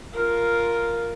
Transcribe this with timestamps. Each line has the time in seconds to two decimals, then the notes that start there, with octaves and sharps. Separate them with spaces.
0.13 F4 A#4